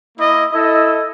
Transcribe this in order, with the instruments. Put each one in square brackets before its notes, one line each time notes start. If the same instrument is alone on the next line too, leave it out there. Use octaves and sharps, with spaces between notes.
[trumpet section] A#3 E4 D#5
[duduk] E4 [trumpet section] A4 D#5